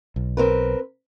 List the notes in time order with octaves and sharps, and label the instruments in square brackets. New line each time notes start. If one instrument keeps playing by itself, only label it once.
[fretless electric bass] B1
[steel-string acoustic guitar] C4 A#4 B4